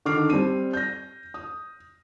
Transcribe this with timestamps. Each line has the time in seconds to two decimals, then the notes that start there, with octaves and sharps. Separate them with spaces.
0.05 D3 D#3 D6 F6 C7
0.30 G3 C4 D#7
0.73 G6 A#6
1.34 D#6